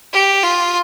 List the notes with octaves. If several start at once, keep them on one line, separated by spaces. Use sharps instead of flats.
G4
F4